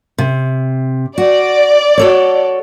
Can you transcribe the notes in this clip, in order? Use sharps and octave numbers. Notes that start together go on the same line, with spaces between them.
C3
F#4 D5
F#4 A4 C#5